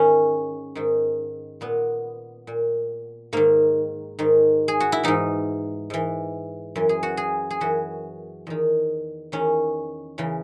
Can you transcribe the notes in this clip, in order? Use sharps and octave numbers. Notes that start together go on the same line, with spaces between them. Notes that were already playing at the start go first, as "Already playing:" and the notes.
Already playing: G#2 D#3 C#4
G#2 D#3
A#2 B3
A#2
G#2 D#3 A#3
G#2 D#3
G#4
F#4
E4
G#2 E3 D#4
G#2 E3
F#2 E3
G#4
F#4
G#4
G#4
F#2 E3 F#4
E2 D#3
E2 D#3 C#4
E2 C#3 E3